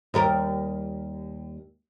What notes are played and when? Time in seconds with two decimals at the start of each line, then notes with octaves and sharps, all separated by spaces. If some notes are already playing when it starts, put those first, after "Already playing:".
0.14 D#2 G3 A#4